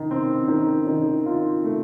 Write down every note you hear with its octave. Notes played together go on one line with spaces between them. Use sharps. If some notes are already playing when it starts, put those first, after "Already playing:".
Already playing: D#3
C4
D#3
D#3
F4
A3